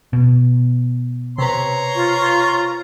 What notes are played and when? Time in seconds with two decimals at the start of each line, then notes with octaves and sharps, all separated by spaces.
0.13 B2
1.38 C3 B4 C#5 A#5 C6
1.95 F4